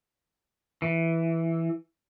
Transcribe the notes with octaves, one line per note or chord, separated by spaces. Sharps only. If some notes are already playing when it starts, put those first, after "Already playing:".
E3